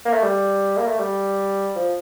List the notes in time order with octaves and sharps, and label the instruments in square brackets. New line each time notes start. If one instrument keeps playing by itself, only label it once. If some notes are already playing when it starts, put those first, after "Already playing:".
[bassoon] A#3
A3
G3
A#3
A3
G3
F3